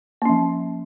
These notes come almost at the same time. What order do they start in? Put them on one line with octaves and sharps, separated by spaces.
A#3 C#4 F3